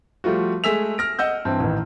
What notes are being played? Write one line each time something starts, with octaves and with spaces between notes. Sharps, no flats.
F3 G3 A3 F4 F#4
G#3 A3 G#5 E6 B6 F7
F6 A#6 D7
D#5 F#5 E6 G6
G2 E3 C4
A1 D#3